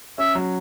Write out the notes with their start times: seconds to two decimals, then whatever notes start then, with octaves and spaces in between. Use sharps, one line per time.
0.18 C#4 E5
0.35 F#3